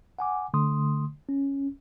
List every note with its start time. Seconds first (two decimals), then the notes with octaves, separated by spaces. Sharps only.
0.19 F#5 G#5 D6
0.54 D3 A3 C6 D#6
1.29 C#4